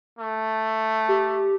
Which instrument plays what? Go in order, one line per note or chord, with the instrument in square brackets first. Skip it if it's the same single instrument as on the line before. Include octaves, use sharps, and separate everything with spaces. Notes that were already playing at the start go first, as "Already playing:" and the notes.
[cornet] A3
[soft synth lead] G4